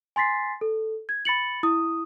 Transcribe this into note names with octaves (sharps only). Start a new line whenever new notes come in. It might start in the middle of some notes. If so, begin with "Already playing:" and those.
G#5 C6 A6 B6 C7
A4
G#6
B5 A6 C#7 F#7
E4 D#6